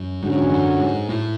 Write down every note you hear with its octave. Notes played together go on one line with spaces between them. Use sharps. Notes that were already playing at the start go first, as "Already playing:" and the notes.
Already playing: F#2
G#2 D3 F#3 C#4 F#4
E2
F#2
G#2
A2